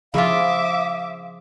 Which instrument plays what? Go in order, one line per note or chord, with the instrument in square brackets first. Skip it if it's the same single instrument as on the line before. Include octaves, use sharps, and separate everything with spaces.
[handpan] C#3 F3 G#4 [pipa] E4 F4 [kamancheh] E5 D6 [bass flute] F5